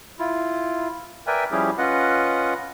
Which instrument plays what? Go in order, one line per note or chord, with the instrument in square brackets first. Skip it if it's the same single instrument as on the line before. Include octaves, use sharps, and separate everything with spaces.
[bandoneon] E4 F4
A#4 B4 D5 E5 G5 G#5
F3 G3 C#4 E4 G4 G#4
C#4 F4 B4 D#5 F#5